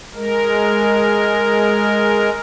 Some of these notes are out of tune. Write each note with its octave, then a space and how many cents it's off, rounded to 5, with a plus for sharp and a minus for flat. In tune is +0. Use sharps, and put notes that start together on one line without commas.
G#3 +0 A#4 +0